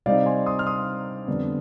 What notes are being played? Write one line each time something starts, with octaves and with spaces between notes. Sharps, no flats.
C3 G3 C4 D#4 D5 F5
G#5 C6
C6 D#6
F6
C6 D#6
F2 D3 G3 B3